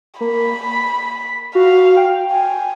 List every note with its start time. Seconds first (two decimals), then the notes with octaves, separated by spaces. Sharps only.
0.21 A#3 B5
0.73 B6
1.55 F#4 F5
1.97 G5
2.32 G#5